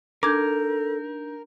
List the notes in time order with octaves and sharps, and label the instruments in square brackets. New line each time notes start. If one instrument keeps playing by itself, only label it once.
[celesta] D4 D#4 G6 [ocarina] A4 [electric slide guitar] A#4 [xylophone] D6 G#6